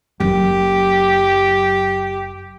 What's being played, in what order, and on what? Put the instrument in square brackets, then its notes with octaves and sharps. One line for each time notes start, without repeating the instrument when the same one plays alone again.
[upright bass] F#1 F#2 [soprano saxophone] G4